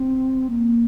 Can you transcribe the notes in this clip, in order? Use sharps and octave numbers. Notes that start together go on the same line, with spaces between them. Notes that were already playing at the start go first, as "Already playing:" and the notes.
Already playing: C4
A#3